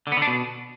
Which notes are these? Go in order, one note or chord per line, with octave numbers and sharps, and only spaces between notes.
D3
B3
D3
D4
B2